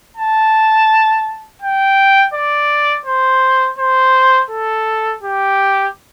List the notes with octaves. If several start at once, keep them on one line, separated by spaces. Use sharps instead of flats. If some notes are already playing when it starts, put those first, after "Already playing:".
A5
G5
D5
C5
C5
A4
G4